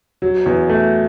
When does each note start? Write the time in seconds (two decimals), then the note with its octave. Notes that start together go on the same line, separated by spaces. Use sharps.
0.22 F#3
0.46 E2
0.69 A3